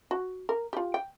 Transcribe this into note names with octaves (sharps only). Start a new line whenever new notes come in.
F#4
A#4
F4 G4
G5